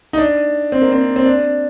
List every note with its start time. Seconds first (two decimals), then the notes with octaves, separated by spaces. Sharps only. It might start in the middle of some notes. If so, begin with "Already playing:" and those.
0.13 D#4
0.18 D4
0.72 C4
0.82 A#3
0.92 C4
1.16 C4
1.25 D4